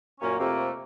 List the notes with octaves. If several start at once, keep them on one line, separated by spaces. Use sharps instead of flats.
F#2 A#2 A#3 C#4
F2 C3 A3 A#3